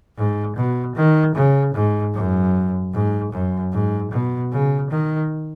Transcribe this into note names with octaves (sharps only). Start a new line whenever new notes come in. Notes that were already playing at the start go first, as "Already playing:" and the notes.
G#2
B2
D#3
C#3
G#2
F#2
G#2
F#2
G#2
B2
C#3
D#3